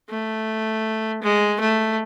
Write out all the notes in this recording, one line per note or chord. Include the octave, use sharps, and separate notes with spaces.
A3
G#3
A3